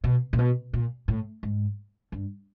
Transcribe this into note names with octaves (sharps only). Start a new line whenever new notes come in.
B2
A#2
B2
A#2
A2
G#2
G2